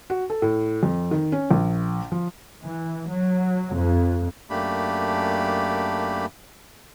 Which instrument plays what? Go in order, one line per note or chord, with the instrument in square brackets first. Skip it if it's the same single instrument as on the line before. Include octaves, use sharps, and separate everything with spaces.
[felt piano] F#4
A4
A2
F2
D#3
C#4
A#1
F3
[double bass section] E3
F#3
F2
[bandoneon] F#2 A3 A#3 D4 G4 B5